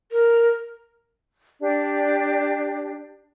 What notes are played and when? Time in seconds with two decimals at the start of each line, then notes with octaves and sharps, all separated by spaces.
0.12 A#4
1.61 D4 G4 D5